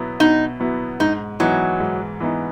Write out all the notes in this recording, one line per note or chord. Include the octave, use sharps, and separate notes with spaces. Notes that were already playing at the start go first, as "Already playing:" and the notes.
Already playing: B2 F#3 B3 E4
B2 D#4
F#3 B3 E4
G#2 D#4
E3 F#3 B3 D#4
G#2
E3 B3 D#4